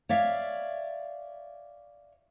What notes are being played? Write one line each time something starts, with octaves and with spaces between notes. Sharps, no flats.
C#5 D5 E5 F5